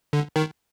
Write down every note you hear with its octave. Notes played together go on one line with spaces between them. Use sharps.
D3
D#3